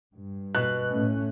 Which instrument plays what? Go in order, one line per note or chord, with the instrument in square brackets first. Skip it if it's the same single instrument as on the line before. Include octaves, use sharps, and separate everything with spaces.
[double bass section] G2
[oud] B2 [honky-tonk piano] F#6
[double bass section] A2 A3 C#4